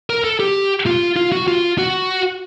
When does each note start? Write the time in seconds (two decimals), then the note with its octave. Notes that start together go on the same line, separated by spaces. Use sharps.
0.10 A#4
0.24 A4
0.40 G4
0.86 F4
1.16 F4
1.32 F#4
1.48 F4
1.78 F#4